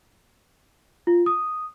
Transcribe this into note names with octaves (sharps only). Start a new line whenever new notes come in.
F4
D#6